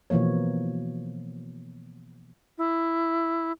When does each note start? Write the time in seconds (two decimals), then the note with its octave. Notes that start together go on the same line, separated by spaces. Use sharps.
0.10 B2 E3 F3 A#3 C#5
2.58 E4